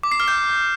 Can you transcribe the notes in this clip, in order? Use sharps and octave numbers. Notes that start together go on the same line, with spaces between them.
D6
C7
F6
G6